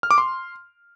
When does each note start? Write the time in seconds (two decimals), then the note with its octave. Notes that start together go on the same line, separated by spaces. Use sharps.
0.03 F6
0.11 D6
0.18 C6